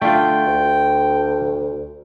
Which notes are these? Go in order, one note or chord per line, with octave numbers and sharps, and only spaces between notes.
D3 A3 F4 G5
D2